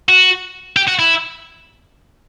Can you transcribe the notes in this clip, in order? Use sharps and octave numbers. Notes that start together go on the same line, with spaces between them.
F#4
G4
F#4
E4